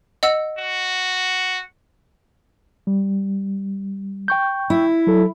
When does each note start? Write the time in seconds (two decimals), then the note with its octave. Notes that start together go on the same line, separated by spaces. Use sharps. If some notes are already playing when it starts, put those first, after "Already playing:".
0.23 D#5 F#5 E6
0.59 F#4
2.87 G3
4.28 G5 C#6 G6
4.70 E4
5.07 F#3 A4